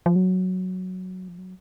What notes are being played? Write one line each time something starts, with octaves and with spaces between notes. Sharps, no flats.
F3
F#3
F3
F#3